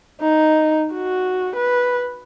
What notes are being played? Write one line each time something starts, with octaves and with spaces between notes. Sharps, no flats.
D#4
F#4
B4